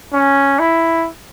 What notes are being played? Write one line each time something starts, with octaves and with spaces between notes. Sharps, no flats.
C#4
E4